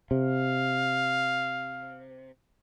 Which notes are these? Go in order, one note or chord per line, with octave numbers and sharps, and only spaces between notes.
C3 F5